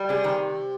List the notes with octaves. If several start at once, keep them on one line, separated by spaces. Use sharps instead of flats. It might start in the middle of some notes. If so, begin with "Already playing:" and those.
Already playing: G3
C3 G#4
D#3